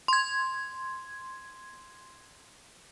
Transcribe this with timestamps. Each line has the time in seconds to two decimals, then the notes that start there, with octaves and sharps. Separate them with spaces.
0.08 C6 G#6